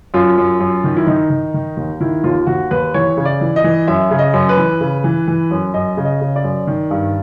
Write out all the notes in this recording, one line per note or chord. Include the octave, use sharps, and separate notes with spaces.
F#2 F4
F#2
F#2
D#3
E4
D#3 D#4
D#3
D#3
D#2
D#3 E4
D#2 F4
D#2 F#4
D#2 B4
E3 C#5
C#3
D5
E3
D#5
E3
F#2 E5
C#3
D#5
F#2
B4
E3
C#3
E3
E3
F#2
F#2 D#5
C#3
D#5
C#3
D5
F#2
D#3
G2